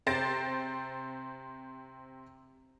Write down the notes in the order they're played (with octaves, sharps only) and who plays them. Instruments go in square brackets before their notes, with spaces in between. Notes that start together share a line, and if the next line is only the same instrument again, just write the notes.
[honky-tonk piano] C3 C5 A6 A#6 D7